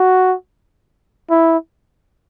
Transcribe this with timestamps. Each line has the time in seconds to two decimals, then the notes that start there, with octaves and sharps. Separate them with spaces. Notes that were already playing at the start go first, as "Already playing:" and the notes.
Already playing: F#4
1.30 E4